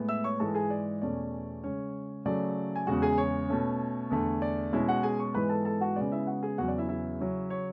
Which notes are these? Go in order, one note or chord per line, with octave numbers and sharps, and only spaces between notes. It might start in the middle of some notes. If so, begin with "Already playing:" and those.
Already playing: A2 G#3 B3
E5 E6
C#5 C#6
G#2 E3 G#3 A4 A5
G#4 G#5
D5
E2 B2 A3 C#4 D5
C#3 G#3 C#4 C#5
C#3 F#3 A3 D5
G#5
E2 C#3 G#3 F#4 F#5
G#4 G#5
C#5
B2 A3 C#4
E2 D3 A3
D5
B2 G#3 C#4 E4 E5
F#4 F#5
G#4 G#5
C#5 C#6
G#2 E3 G#3 B3 B4 B5
A4 A5
A4 A5
F#4 F#5
C#3 G#3 B3 D5
E4 E5
F#4 F#5
G#4 G#5
E2 C#3 F#3 B3 F#4 F#5
D5
E4 E5
E4 E5
C#3 F#3 C#4
C#5